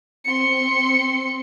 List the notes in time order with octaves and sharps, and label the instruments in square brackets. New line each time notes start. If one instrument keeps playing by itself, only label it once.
[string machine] C4 [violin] C6 C#7